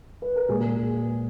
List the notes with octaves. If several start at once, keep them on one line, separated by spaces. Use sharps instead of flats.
B4
A#4
A#2 G#3 G#4